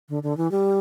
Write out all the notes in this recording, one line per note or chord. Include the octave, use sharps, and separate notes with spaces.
D3
D3
E3
G3